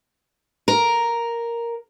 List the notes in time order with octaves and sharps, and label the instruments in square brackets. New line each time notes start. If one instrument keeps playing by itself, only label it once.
[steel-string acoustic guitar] A#4